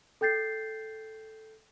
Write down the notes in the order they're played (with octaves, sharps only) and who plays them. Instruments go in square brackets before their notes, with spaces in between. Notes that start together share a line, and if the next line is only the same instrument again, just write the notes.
[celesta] A4 G5 G6 A6 C7